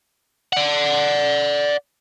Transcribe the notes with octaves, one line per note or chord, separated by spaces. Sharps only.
D5 F#5